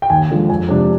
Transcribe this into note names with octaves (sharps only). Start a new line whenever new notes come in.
G5
D#2 G#5
D3 F3 G#3
F2 G#5
C3 F3 G#3 D4